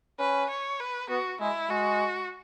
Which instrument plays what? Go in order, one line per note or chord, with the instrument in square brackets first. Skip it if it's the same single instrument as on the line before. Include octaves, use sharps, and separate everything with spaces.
[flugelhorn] C#4 [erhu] B4
[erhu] C#5
B4
[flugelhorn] B3 [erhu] F#4
[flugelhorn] G#3 [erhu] E4
[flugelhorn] G#3 [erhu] F#4